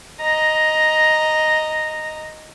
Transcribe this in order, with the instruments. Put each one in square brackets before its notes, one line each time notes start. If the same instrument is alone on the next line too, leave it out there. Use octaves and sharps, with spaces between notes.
[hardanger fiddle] D#5 A#5